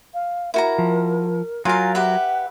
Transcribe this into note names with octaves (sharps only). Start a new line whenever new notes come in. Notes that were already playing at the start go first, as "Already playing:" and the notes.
F5
E4 F#4 A#4 A#5
F3
F#3 F4 A#4 F5 G#5
G4 B4 E5 F#5